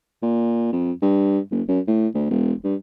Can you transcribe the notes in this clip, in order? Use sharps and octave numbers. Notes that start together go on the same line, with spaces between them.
A#2
F2
G2
F#1
F#2
A2
D2
E1
G2